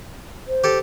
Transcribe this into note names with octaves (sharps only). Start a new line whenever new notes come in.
C5
G4 A4